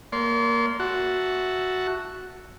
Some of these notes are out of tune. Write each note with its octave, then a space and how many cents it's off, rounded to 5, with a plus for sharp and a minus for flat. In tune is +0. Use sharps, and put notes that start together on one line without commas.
A#3 +0 D5 -45 C6 +0
F#4 +0 E5 -5 A5 +0